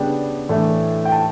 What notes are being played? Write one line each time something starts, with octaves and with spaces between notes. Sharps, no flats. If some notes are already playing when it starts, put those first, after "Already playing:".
Already playing: C#3 G3 B3 D4 G5
A2 E3 A3 D4
G5
A5